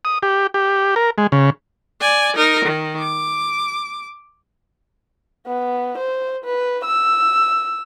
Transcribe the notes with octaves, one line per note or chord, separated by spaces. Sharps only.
D#6
G4
G4
A#4
G#3
C#3
D5 G#5
D#4 A#4
D#3
D6
B3
C5
B4
E6